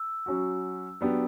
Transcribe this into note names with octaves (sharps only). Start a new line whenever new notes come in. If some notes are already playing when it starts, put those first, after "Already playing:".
Already playing: E6
F#3 C#4 F#4
F#3 B3 D4 G4